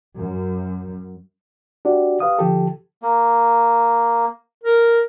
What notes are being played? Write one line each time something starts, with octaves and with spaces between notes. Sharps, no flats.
F#2
D4 F#4 G4 D5
G4 B4 F5 D#6
D3 F3 G4 A4
A#3
A#4